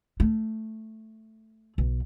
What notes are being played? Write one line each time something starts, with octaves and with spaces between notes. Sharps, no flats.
A3
B1